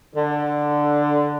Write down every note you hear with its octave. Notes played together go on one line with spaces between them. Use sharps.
D3